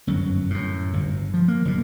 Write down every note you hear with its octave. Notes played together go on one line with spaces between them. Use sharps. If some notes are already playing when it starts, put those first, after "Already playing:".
G1 F#2 F#3
F#2 A2
G1
F3
A#3
F#1 A#2